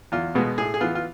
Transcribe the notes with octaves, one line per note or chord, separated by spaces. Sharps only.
E2 F4
B2 G#3 B3
A2 G#4
G#4
E3 B3 F4
F4